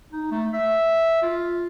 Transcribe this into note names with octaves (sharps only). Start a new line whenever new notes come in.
D#4
A3
E5
F4